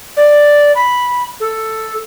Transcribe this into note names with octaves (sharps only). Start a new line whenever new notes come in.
D5
B5
A4